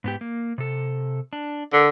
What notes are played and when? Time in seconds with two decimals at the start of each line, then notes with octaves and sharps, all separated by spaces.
0.04 G#2 B3 G4
0.21 A#3
0.58 C3 A4
1.33 D4
1.73 D3 A#4